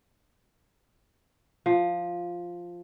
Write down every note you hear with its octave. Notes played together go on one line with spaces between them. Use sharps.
F3